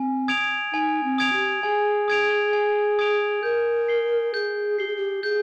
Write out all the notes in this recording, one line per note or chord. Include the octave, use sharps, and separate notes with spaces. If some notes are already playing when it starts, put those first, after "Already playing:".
Already playing: C4 G#5
D#6 G#6 D7 F7
D#4 G#5
C4
D#6 G#6 D7 F7
G4
G#4 G#5
D#6 G#6 D7 F7
G#5
D#6 G#6 D7 F7
A#4 G6
C7 G7
G#4 G6
G4 C7 G7
G#4
G4
G#4 G6